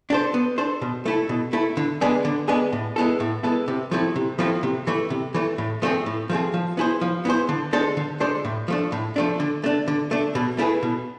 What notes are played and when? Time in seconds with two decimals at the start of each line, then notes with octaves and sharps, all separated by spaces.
0.10 D4 A4 C5
0.34 B3
0.58 D4 A4 C5
0.81 B2
1.05 A3 E4 A4
1.29 B2
1.53 A3 E4 A4
1.77 D3
2.01 G#3 B3 D4 G#4
2.25 D3
2.48 G#3 B3 D4 G#4
2.72 A2
2.96 G#3 B3 E4 A4
3.20 A2
3.43 G#3 B3 E4 A4
3.68 C3
3.91 F3 A3 C4 E4
4.16 C3
4.39 F3 A3 C4 E4
4.63 C3
4.87 E3 A3
5.10 C3
5.34 E3 A3
5.58 A2
5.82 F3 A3 C4 G#4
6.06 A2
6.29 F3 A3 C4 G#4
6.54 F3
6.77 B3 E4 G#4 C5
7.01 F3
7.25 B3 E4 G#4 C5
7.49 D3
7.73 G#3 D4 A4 C5
7.97 D3
8.20 G#3 D4 A4 C5
8.45 A2
8.68 F3 A3 D4
8.92 A2
9.16 F3 A3 D4
9.40 D3
9.64 A3 D4
9.88 D3
10.11 A3 D4
10.35 B2
10.58 A3 E4 G#4 B4
10.83 B2